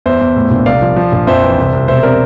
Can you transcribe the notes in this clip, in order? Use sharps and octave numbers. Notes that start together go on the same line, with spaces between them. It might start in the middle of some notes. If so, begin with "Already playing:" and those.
E2 C5 E5
E2
A2
A#1
C2 D5 F5
F3
F3
A#1
F2 C5 E5
E3
C2
C2
E1 C5 E5
C3 A#4 D5